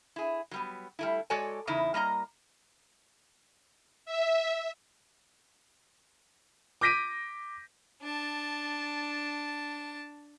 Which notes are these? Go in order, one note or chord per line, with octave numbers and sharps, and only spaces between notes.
E4 G#4
F#3 G3 B3
G3 A3 E4
G#3 F#4 A4 C#5 D5 G#5
E2 C#3 D#4 E4
G3 A#3 D#5 A#5
E5
D6 G6 A#6 B6 D7 D#7
D4 A5